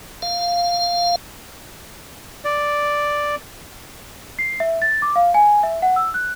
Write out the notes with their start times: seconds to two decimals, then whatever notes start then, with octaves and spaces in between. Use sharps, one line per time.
0.22 F5
2.45 D5
4.39 C7
4.60 E5
4.82 A6
5.02 D6
5.16 F5
5.34 G#5
5.63 E5
5.82 F#5
5.96 E6
6.14 F#6